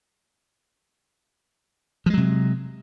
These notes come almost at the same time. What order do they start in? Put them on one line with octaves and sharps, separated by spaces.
F3 G#3 F#3 C3